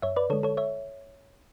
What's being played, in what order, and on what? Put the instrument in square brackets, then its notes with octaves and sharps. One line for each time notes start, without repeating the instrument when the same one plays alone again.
[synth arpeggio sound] F#2 C#5 E5
B4 D5
D3 G#3 A4 C#5
A4 C#5
C#5 E5